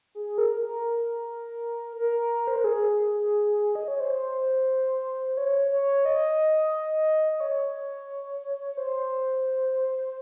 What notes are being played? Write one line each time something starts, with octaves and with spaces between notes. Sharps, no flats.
G#4
A#4
A#4
A#4
C5
A#4
G#4
D#5
C#5
C5
C#5
C#5
D#5
D#5
C#5
C5